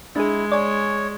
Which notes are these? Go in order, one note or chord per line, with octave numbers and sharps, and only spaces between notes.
G#3 D4 E4 G#4
C#5 D5 G#5